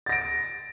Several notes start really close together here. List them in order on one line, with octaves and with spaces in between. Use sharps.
A6 A#6 D7